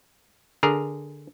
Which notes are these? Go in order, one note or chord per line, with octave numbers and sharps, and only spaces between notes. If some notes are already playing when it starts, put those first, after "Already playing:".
D3 G#4 A#4